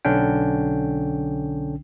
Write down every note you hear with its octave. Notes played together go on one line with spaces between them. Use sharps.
B1 D3 C#4 D4 G5